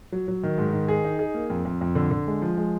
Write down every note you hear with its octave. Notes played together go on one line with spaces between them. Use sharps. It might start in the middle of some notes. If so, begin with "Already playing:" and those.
F#3
F#3
D#3
G#2
D#3
G#4
D#4
G#4
A#3
F2
F2
F2
D3
D3
G#3
F3
G#3